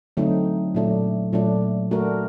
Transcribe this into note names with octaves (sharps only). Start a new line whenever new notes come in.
D3 F#3 A3 C4 D#4
A#2 F#3 A3 D4
A#2 F#3 A3 D4
A3 D4 F#4 A#4